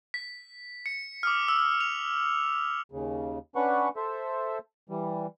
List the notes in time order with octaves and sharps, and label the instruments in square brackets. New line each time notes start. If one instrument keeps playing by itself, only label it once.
[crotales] B6
C#7
D6 D#6 F6
E6
F7
[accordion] D#2 C#3
C#4 D4 B4 F#5 C#6
A4 C5 E5
E3 G3